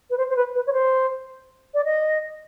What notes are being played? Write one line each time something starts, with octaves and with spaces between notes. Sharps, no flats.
B4
C5
C5
B4
B4
C#5
C5
D5
D#5